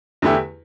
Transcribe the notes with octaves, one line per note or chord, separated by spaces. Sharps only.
E2 D3 A3 E4 G4